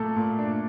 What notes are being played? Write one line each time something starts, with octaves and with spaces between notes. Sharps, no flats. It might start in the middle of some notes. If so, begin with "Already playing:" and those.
Already playing: A#2 A3 A4
A#2
D4